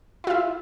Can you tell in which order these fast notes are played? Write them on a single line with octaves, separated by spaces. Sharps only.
E4 F4 E5